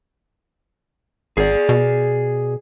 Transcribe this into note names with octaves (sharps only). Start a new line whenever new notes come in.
G#1 G#4 D5
B2